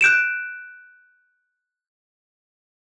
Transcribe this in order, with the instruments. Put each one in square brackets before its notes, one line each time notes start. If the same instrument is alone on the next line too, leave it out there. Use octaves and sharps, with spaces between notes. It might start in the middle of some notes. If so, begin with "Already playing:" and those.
[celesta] F#6 G6 D7 E7